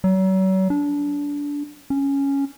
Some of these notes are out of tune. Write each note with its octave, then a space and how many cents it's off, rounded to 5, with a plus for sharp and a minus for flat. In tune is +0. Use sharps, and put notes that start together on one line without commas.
F#3 +40
D4 -20
C#4 +0